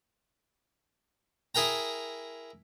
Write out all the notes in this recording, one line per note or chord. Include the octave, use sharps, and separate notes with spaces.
E4 G#4 A#4 G5 A#5